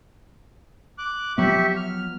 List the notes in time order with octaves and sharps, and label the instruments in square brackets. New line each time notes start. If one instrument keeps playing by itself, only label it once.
[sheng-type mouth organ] D6 F#6
[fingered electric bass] F3 F#3 B3 [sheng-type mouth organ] G4 E5 C#6
[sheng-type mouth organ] F6